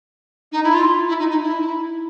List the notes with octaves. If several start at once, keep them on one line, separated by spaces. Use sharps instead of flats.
D#4
E4
F4
E4
D#4
D#4
E4